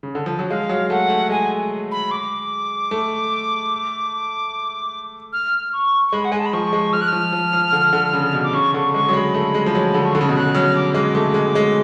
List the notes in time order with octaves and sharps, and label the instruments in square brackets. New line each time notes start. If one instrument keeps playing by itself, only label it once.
[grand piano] C#3
D3
F3
F#3
[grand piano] G#3 [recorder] F5
[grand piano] F#3
[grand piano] A3 [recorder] F#5
[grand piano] A3
[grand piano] G#3 [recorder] G#5
[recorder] B5
D6
[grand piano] A3
[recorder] F6
C#6
C#6
[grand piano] G#3 [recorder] B5
[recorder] F#5
[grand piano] G#3 [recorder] G#5
[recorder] A5
B5
[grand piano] F3 [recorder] C#6
[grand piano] G#3
[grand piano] F3 [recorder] F6
[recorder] F#6
F6
[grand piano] F3
F3
F3
D3
D3
C#3
B2
[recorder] D6
[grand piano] C#3 [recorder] C#6
[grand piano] D3 [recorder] C#6
[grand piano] G#3 [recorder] C#6
[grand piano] F#3
[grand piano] G#3 [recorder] B5
[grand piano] A3
G#3
F3
F#3
D3
[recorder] C#6
[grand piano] D3 [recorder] B5
[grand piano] C#3
B2
[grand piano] C#3 [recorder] F#6
[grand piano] F#3 [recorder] F6
[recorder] D6
[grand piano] G#3 [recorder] D6
[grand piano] A3
G#3
G#3